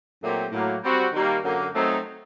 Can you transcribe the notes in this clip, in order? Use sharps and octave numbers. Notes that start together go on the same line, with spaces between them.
A#2 F#3 A3 C4 G4
A2 F#3 A#3
G3 C4 F#4
D#3 G3 A#3
F#2 D3 F#3 A#3
F#3 A3 C4 D#4